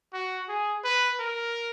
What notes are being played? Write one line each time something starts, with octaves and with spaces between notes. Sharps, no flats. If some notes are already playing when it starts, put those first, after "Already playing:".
F#4
G#4
B4
A#4